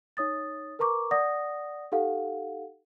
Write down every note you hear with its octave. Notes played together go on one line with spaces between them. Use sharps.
D#4 C#5 D#6 A6
A#4 B4 A#5 C#6 D6
D5 F#5 D#6 A#6
D#4 G4 A4 F5 F#5